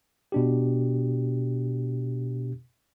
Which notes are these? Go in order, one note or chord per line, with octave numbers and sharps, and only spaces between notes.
B2 D4 G4